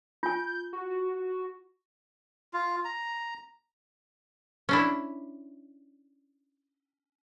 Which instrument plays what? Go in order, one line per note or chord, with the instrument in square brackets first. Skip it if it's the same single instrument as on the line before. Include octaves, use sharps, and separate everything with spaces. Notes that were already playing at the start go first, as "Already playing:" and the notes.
[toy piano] F4 G#5 [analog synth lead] G6
[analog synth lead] F#4
[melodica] F4
A#5
[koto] C#4 D4 E4